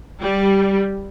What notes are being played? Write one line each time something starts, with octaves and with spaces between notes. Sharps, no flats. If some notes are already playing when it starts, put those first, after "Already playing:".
G3